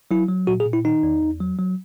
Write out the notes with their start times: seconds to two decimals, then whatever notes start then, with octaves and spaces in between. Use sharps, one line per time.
0.11 F#3 E4
0.29 F#3
0.47 A#2 F#4
0.60 G#4
0.66 A#2
0.73 E4
0.85 D#3 D#4
1.03 E2
1.23 E2
1.41 F#3
1.59 F#3